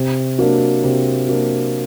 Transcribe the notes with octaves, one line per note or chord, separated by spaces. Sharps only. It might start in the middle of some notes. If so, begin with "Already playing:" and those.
Already playing: C3
F#3 A#3 D4
C3
F#3 A#3 D4